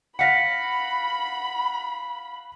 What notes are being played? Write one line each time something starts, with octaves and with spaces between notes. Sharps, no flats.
F5 F#5 B5 A#6 B6 C#7